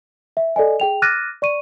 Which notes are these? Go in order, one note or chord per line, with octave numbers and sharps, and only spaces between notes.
E5
A4 D5 D#5 G#5
G#4 G5 F7
D6 F6 F#6 A6 A#6 D#7
D5 C#6 D#7